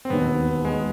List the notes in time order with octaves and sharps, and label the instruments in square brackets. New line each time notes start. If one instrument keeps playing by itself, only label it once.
[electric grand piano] C4
[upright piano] E1 D#2 D#3 [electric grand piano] B3
[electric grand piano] G#3